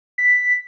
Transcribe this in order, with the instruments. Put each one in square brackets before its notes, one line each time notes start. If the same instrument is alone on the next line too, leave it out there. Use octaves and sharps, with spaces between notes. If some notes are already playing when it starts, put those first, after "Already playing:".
[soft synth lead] B6